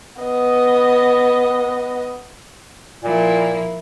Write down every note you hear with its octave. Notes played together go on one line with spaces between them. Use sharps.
B3 D#5
A#2 F3 A#3 E4